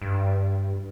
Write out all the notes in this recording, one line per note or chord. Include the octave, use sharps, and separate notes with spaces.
G2